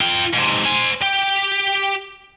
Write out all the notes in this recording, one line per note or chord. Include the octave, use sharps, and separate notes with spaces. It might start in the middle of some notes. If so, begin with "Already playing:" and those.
F4 G5
G#2 C3
C5 G#5
G4